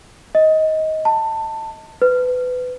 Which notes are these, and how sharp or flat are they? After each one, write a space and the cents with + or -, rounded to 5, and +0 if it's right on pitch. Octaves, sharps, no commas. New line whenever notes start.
D#5 +15
A5 +20
B4 +25